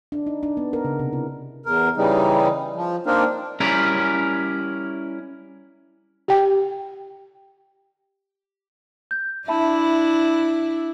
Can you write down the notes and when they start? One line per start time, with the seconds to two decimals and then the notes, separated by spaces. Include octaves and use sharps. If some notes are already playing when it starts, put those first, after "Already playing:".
0.12 D4
0.26 D#4
0.43 D4
0.57 B3
0.73 A#4
0.85 C#3
0.99 C3
1.13 E4
1.66 E2 A#4
1.97 C#3 E3 G3 D#4
2.76 F3
3.07 A#3 C4 D4 D#4 A#4
3.60 G3 C#4 E4 A#4
6.28 G4 G5
9.11 G6
9.48 D4 E4 E5 A5 B5